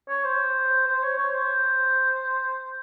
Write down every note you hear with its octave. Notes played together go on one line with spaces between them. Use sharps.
C#5
C5
C5
C#5
C#5
C5